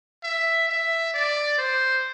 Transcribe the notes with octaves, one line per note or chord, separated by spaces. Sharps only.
E5
E5
D5
C5